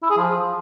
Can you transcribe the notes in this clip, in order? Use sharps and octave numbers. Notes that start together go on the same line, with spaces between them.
E4
G#4
F3